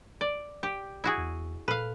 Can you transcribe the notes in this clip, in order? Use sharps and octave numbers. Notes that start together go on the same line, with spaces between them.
D5
G4
E4 F#4 G#4
E2
A#2 A4 B4 F5 F6